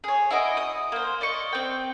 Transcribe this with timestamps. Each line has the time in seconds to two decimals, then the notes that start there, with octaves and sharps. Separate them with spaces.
0.04 G#4 C#5
0.31 E4 F#4 D#5 D6
0.57 D#6
0.92 A#3 C5
1.21 D5 D#5 C#6
1.52 C4 G5